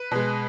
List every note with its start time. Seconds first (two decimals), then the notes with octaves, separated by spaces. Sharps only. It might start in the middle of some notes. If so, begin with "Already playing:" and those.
Already playing: B4
0.11 B2 G#3